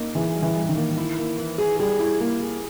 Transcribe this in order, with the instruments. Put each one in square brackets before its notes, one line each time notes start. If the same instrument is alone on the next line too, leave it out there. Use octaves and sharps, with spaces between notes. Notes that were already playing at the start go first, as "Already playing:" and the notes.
Already playing: [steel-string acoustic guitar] A#3 [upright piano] D#4
[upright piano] E3 [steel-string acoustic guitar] G#4
[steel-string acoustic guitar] G3
[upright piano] E3
[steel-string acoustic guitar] G3
[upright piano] D#3
[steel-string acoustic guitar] A#3
E4
A#3
E3
G#4
[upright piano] G3 [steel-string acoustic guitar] G#4
[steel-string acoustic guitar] E4
A#3
G#4